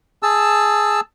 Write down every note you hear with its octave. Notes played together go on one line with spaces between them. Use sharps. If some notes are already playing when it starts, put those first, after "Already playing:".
G#4 A5 E6